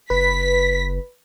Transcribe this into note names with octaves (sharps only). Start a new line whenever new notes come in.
F#1 B4 B6